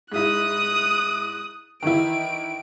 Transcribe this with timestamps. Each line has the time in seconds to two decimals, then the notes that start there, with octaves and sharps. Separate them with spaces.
0.12 G#2 E4 D#6 F#6
1.83 D#3 E3 E4 D7